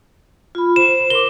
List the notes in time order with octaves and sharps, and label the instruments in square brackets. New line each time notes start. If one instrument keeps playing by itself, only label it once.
[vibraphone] F4 B5
[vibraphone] C5 [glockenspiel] E7
[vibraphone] A#4 C6 D6 [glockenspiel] G7